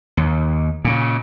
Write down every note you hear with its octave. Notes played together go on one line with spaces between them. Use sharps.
D#2
A#2 C#3